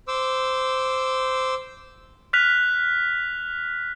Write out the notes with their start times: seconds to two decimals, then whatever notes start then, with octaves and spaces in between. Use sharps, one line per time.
0.08 C5 D6 E6
2.33 F6 F#6 B6 F7